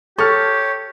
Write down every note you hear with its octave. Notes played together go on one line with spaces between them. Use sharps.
G4 A4 C#5 C#6 F6